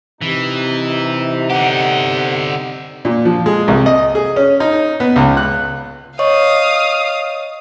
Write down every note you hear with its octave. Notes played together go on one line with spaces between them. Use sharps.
C3 E3 D#4
D3 G4 F#5
A#2
F3
G#3
C2
D#5
G#4
C#4
D#4
B3
C#2
F#6
C#5 D#5 F5 C#6 D#6